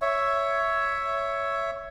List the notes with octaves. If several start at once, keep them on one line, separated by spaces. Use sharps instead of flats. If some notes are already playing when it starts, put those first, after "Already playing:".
C#5 E5